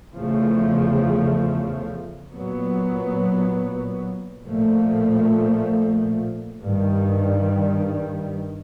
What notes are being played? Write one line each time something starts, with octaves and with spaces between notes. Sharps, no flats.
E2 C#3 F3 A3
A#2 F#3 B3
A#2 F3 A3
G2 D#3 G3